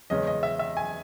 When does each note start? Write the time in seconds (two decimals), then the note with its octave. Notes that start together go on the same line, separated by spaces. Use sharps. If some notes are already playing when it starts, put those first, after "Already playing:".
0.10 E2 C#3 G#3 C#4 D#5
0.27 D#5
0.43 E5
0.59 E5
0.77 G#5